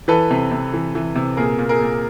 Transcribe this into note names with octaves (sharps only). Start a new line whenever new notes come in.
E3 A4 B4
C3
C3
E3
E3
C3
A#2 G#4 A#4
A#2
G#4 A#4
A#2